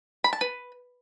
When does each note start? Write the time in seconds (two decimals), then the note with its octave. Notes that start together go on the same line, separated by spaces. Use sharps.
0.24 B5
0.33 A5
0.41 B4